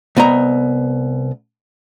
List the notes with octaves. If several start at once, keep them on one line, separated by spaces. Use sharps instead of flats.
C2 B3 D#5 A#5